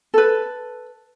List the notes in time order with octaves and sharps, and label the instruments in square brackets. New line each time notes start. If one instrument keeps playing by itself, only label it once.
[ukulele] A4 B4